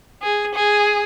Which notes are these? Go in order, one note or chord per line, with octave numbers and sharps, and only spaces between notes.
G#4
G#4